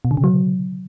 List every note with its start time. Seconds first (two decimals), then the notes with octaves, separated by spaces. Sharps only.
0.05 B2
0.11 D3
0.17 C#3
0.24 F#3